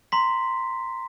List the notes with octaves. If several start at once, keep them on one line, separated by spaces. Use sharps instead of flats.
A#5 C6 B6